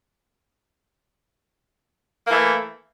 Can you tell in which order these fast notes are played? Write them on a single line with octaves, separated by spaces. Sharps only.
A#3 E3 A3